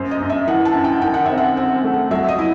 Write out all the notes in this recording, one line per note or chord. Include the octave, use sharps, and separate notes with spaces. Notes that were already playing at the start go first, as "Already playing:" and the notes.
Already playing: F#2 C5
D#5
F#2
E5
E3 F#5
A5
F#2
G5
D#3 G5
F#5
C4 E5
F#5
C4
A3
F#3 E5
D#5
E4